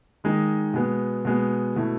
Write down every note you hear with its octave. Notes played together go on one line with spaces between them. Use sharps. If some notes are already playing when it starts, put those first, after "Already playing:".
D#3 G#3 D#4
B2 G#3 B3
B2 G#3 B3
B2 A3 E4